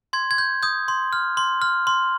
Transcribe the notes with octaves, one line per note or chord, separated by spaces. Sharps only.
C6 G#6
G#6
G6
D#6 G6
C6
F6
C6
F6
C6